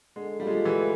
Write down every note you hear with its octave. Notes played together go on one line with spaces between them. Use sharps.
D3 G#3
F3 G3 A3
G#3
G3
D3 E3